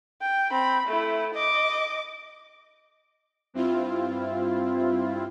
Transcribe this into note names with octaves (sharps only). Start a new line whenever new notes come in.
G5
C4 B5
A3 E4
D#5 D6
G2 C4 E4 F4